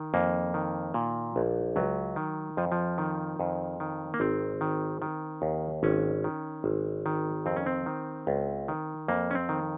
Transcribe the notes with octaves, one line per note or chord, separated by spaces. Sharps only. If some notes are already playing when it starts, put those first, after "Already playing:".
Already playing: D#3
F2 A#3
D#3
A#2
A#1
C#2 F#3
D#3
F2 F3
F3
D#3
F2
D#3
A#3
G#1 C4
D#3
D#3
D#2
G#1 C#4
D#3
G#1
D#3
F2 C4
C#4
C4
D#3
C#2
D#3
F2 A#3
C#4
C4
D#3